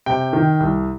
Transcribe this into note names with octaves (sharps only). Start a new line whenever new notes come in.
C3 G5
D#3
C2